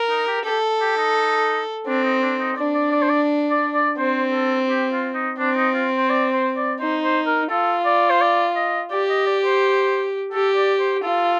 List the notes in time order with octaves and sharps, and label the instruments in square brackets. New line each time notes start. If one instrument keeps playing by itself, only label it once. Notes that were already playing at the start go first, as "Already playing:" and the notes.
Already playing: [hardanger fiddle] A#4
[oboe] D#4
G4
[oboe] G4 [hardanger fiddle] A4
[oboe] G4
D#4
[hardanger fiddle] C4 [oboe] D4
[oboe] D#4
D4
D#4
[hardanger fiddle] D4 [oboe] D5
[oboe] D5
D5
C5
D5
D5
D5
[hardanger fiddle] C4 [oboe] C5
[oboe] A4
G4
F4
D#4
[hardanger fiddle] C4 [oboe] D4
[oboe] D#4
F4
C5
D5
C5
D5
[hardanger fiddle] D#4 [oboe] C5
[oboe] C5
A#4
[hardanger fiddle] F4 [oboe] A4
[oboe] D5
C5
D5
D#5
[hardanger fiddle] G4 [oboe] D5
[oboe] D#5
D5
C5
[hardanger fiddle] G4 [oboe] A4
[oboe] D5
C5
[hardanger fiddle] F4 [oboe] A4